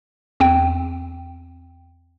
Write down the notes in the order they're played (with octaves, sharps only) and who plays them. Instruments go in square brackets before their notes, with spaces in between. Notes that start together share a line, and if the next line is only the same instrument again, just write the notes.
[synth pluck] E2 C4 G5